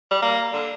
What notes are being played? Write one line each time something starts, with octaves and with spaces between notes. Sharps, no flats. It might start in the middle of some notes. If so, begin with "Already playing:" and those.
G3
A#3
D3